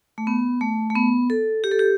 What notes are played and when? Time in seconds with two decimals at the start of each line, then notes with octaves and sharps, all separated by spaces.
0.18 A3
0.27 B3
0.61 A3
0.90 A3
0.96 B3
1.30 A4
1.64 G4
1.71 A4
1.79 G4